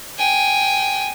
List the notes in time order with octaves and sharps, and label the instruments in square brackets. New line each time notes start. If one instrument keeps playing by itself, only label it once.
[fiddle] G5 G#5